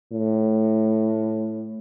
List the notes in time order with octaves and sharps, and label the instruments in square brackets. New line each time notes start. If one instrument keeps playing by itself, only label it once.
[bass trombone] A2